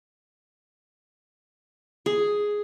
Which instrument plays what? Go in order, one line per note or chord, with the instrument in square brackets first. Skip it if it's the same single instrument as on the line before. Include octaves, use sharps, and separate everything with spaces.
[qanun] G#4